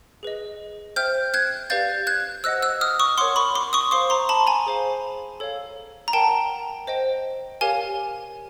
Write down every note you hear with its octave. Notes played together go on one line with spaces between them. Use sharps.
G#4 B4 D#5
C5 E5 G5 F6 G6
F#6 G#6
G4 B4 D5 F5 G6 A6
F#6 G#6
C5 D#5 F#5 E6 F#6
E6 F#6
D#6 F6
C#6 D#6
A#4 C#5 F#5 C6 D6
B5 C#6
C6 D6
C#6 D#6
C5 F5 C6 D6
A#5 C6
A5 B5
G#5 A#5
G#4 C5 F5
A4 C#5 F5
A#5
A#4 C#5 F#5 G5 A5
C5 D#5 G5
G4 A#4 C#5 F5 G#5